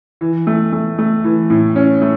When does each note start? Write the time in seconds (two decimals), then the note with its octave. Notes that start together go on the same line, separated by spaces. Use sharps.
0.21 E3
0.47 A3
0.72 A3
0.98 A3
1.24 E3
1.50 A2
1.76 C#4
2.01 A3